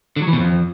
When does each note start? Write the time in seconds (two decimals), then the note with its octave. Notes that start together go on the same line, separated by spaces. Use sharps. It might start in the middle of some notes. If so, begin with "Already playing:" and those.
0.16 D3
0.22 F#3
0.27 E3
0.33 B2
0.39 F2